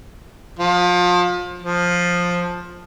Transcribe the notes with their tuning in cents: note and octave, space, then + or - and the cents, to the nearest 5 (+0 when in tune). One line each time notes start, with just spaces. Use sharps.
F3 +30
F3 +10